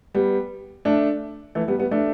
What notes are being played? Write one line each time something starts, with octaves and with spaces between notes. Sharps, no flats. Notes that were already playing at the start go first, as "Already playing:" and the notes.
G3 B3
A3 D4
E3 A3
G3 B3
G3 B3
A3 D4